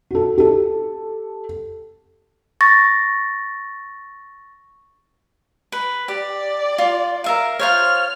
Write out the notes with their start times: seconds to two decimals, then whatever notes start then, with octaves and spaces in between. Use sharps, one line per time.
0.11 F#4 A4
0.38 G4 A4
2.61 C#6 A6 A#6
5.72 B4
6.08 G4 D5
6.78 F4
7.24 A#4 E5 F5
7.59 F4 C5 C#5 F6